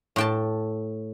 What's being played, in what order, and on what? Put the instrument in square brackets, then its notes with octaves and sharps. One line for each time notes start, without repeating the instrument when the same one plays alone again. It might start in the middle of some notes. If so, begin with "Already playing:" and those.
[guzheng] A2 G5 A5